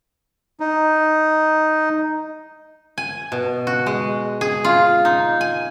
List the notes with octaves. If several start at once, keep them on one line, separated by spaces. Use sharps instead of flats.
D#4
G#5
B2
F#4
G#3
G#4
F4
D#4
G#5